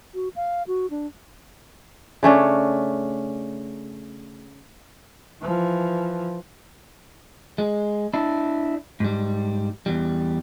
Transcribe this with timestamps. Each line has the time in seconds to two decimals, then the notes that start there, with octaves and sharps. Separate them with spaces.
0.15 F#4
0.36 F5
0.67 F#4
0.90 D4
2.23 C#3 A3 C#4 D4
5.42 E3 F3
7.58 G#3
8.14 D4 E4
9.00 G#2 G3
9.86 E2 G3